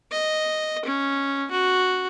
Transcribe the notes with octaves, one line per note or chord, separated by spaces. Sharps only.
D#5
C#4
F#4